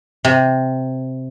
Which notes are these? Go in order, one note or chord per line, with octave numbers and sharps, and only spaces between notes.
C3